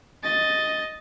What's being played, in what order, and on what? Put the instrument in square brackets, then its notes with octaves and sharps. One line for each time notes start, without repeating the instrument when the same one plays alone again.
[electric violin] D#5 A6